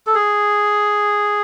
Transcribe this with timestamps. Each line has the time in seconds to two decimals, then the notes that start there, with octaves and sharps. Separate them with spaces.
0.07 A4
0.15 G#4